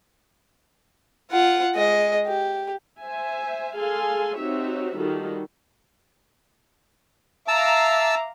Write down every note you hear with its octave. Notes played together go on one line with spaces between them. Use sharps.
F4 F#5
G#3 D#5
G4
C5 E5 G#5
G#4 A4 F5 G#5 C6
C4 D#4 F#4 G4 C#5 E5
D#3 G3 F4 F#4 A4
E5 F5 A5 A#5 D6 E6